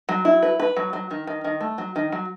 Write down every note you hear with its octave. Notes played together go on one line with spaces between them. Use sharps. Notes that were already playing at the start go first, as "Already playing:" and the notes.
F#3
E4
B4
B4
F#3
F#3
D#3
D#3
D#3
A3
F#3
D#3
F#3